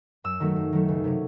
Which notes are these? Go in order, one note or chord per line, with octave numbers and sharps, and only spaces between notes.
F#2 E6
D#3 F#3 A3
F#2
D#3 F#3 A3
C#2
C3 F#3 C#4